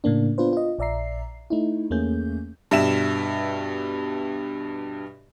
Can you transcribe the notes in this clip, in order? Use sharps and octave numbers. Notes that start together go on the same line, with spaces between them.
A2 C#3 A#3 D4
B3 D4 F4 B4 C5
F4 D#5
A#1 D5 E5 A#5 C7
A3 D#4 E4
E2 A3 A#3 C#4 G#4 G6
G2 B2 E5 E7